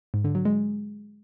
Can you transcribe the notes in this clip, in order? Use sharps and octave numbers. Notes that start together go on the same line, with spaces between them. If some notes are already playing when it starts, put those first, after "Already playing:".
G#2
D3
F#3
G#3